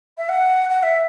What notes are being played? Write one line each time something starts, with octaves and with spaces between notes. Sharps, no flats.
E5
F#5
F#5
E5